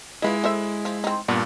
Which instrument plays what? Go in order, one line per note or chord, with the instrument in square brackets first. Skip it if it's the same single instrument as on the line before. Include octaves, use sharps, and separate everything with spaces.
[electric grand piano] G#3 E4 [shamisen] F4 B4 D#5
[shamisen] A4 C5 E5
F3
C4 D#4
[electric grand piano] G2 A#2 D4 [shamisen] B3